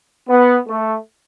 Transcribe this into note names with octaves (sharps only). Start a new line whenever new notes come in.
B3
A3